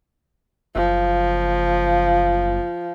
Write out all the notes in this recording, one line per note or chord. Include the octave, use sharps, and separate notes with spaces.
F#1 F3